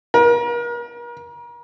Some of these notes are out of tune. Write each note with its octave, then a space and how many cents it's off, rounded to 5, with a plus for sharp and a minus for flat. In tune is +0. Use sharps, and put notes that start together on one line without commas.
A#4 +40